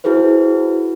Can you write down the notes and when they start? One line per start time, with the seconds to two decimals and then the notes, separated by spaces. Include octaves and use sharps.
0.04 E4 F#4 G#4 B4 C5